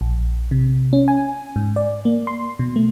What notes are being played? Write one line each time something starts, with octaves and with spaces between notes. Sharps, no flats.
A#1
C3
C#4
G#5
G#2
D5
A#3
C6
B2
A3